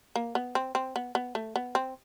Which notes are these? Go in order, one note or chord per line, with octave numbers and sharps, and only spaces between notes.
A#3
B3
C4
C4
B3
B3
A3
B3
C4